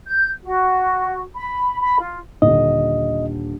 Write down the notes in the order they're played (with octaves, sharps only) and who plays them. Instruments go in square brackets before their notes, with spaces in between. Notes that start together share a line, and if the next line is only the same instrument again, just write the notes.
[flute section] G6
F#4
B5
B5
F4
[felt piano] D#1 D3 [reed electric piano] D#5